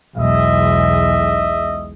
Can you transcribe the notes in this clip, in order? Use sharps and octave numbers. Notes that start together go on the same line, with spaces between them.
B1 E2 G#3 D#5 E5